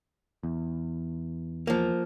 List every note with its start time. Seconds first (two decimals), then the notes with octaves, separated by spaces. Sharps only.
0.43 E2
1.67 F3 A#3